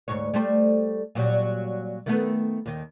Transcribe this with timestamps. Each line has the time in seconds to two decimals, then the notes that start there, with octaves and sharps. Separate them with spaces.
0.08 D2 G#2 C#5
0.34 G3 A3 C5
1.15 A#2 F#3 G3
2.06 D#3 A3 B3
2.66 D#2 D#3